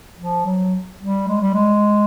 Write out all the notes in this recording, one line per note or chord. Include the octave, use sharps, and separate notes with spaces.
F3
F#3
G3
G#3
G3
G#3